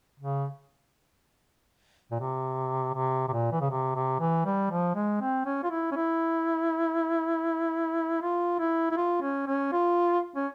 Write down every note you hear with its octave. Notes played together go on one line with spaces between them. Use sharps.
C#3
A#2
C3
C3
C3
A#2
E3
C#3
C3
C3
E3
G3
F3
G#3
C4
C#4
F4
E4
C#4
E4
F4
E4
E4
F4
C#4
C#4
F4
C#4